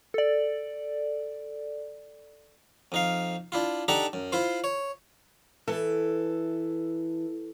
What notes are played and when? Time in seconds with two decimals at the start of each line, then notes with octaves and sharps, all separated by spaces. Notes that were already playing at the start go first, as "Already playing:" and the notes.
0.14 A4 D5
2.92 F2 D#4 F5
3.52 D4 E4 F4
3.88 D4 D#4 G4 A4 F#5 A#5
4.13 F#2
4.32 E4 F4 C5
4.64 C#5
5.68 E3 A4